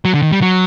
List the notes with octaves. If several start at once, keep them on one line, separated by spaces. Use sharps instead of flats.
F#3
D3
D#3
G3
F#3